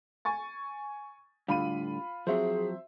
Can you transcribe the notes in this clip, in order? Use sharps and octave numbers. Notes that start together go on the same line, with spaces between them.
G#5 C#6 A6
A2 D3 G3 F4 B5 D#7
F3 F#3 C4 G#4 C5 E5